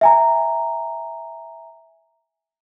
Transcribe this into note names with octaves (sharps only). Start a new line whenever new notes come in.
E5 G#5 A#5